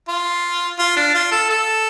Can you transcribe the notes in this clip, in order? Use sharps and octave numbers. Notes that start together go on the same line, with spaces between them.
F4
F4
D4
F4
A4
A4